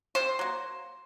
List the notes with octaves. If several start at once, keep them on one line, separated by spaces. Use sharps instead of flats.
C3 C5
F#3 A#3